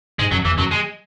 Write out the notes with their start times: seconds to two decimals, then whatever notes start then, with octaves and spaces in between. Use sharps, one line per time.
0.19 G#2 G#3
0.32 F#2 F#3
0.45 E2 E3
0.57 F#2 F#3
0.71 G#3